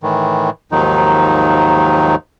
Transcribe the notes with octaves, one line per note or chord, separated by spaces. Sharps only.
A2 D#3 E3
D#2 G#2 D#3 F3 F#3 D#4